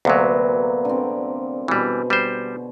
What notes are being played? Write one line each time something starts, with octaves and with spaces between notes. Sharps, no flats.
D2 C3 F#3 A#3 B3
D3 C4
B2 E3 G3 G#4
G3 C5